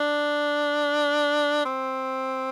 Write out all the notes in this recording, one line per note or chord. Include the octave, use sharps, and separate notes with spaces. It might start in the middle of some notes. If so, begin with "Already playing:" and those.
Already playing: D4
C4